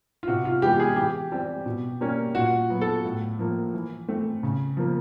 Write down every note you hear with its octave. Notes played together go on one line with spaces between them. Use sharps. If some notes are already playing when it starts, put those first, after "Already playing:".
F4
C3 F#4
F4
E3 G#3 B3 G4
G#4
E3 G4
G3 C4
B2
G3 A#3 C#4
A#2 F#4
F#3 B3
A4
A2
F3 A#3
E3
A3 C4
C#3
F3 A#3